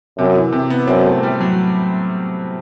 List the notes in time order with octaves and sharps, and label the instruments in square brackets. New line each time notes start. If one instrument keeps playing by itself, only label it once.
[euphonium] F#2 [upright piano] C3
[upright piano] E3
C3
B3
[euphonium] F#2 [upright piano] C4
[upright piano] A3
G3
F#3